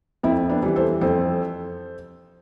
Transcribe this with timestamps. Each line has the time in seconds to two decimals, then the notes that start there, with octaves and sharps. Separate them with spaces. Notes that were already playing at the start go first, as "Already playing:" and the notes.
0.23 F2 C4 E4
0.49 B3 D4
0.63 E3 G3
0.76 A4 C5
1.01 F2 A4 C5